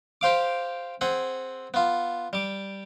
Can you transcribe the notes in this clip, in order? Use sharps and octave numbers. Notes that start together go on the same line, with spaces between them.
G4 C5 F5 D6
C4 G#4 F#5
B3 F4
G3 D6